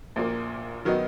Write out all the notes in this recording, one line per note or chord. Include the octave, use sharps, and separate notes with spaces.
A#1 A#2 A#3
D#3 F#3 B3 D#4